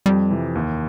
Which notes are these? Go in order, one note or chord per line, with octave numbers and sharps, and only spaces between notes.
F2 G3
C3 E3
D#2